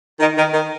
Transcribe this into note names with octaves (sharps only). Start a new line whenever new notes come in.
D#3
D#3
D#3